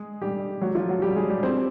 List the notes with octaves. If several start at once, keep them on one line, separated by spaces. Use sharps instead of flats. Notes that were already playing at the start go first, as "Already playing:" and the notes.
Already playing: G#3 G#4
G3 G4
F#3 F#4
F3 F4
F#3 F#4
G3 G4
G#3 G#4
G3 G4
C4 C5